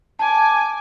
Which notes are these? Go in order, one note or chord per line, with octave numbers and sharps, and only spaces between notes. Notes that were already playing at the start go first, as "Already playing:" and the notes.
G#5 A5 D6